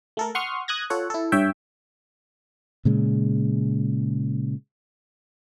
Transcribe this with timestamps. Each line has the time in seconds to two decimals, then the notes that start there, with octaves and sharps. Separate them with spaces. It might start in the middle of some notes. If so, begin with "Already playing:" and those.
0.17 A3 A4 A#4
0.35 F#5 C6 C#6 D#6 F6
0.68 D#6 F#6 G#6 A#6
0.90 F4 A4 C#5 F#5
1.10 E4 A4
1.32 G2 C#5 E5 G5
2.85 A#2 C#3 G#3